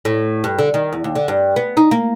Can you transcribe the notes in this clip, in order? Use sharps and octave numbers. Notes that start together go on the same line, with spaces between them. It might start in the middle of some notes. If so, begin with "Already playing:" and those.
A2
G2
D3
D#3
E2
D#2
D3
G2
B3
D#4
A#3